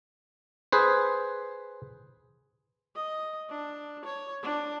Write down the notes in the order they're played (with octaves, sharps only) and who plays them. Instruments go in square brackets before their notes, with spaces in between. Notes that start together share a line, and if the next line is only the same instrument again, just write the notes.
[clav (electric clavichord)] G#4 B4 C5
[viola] D#5
D4
C#5
D4